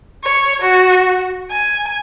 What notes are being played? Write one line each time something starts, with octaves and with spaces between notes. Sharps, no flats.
C#5
F#4
G#5